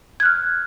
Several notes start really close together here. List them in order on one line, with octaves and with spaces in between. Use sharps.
G#6 F#6 F6